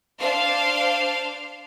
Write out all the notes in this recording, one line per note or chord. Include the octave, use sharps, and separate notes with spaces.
D4 C5 F5